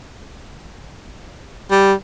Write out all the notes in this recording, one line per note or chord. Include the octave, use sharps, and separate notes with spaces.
G3